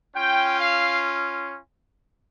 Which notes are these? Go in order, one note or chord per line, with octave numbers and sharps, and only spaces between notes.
C#4 F4 G5
F5